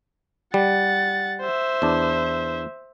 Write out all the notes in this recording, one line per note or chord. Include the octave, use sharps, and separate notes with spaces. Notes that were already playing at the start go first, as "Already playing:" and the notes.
G3 F#5 A6
C5 E5
E2 D4